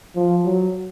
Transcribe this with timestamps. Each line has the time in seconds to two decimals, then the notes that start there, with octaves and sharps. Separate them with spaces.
0.16 F3
0.45 F#3